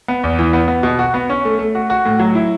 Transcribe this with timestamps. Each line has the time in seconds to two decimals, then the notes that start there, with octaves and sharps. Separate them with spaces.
0.08 B3
0.24 E2
0.39 E3
0.53 B3
0.68 B3
0.83 B2
0.99 F#4
1.14 B3
1.30 C#4
1.45 A3
1.59 A3
1.75 F#4
1.90 F#4
2.05 A2
2.19 F#3
2.35 E4